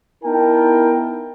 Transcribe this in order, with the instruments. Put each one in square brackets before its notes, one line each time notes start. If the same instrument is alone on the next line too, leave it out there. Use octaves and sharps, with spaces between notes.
[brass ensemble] B3 D#4 E4 A#4 G5 A5